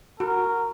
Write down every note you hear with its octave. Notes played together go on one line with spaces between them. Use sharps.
F#4 A#4